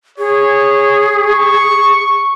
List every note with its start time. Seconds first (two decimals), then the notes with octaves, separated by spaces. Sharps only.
0.18 G#4 C#5
1.22 C#6